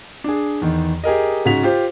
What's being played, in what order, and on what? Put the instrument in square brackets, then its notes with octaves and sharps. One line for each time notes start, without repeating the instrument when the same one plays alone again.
[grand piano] D4 G#4
E2 D#3
G4 G#4 A#4 D#5
G#2 C#3 F#4 B6 F7
F4 G4 C5